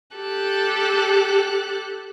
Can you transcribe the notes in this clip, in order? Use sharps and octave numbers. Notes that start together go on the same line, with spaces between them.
G4 A4 F#6